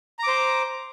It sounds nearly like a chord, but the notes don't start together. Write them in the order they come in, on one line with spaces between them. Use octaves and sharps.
A#5 D6 C5